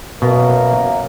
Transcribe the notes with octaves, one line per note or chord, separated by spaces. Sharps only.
F#2 B2 A#3 A#4